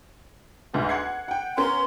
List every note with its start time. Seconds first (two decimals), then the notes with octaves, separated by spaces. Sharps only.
0.74 G1 D2 G#2
0.89 F#5 G#6 C7
1.28 F#5 G5
1.57 B3 C#4 A#4 C6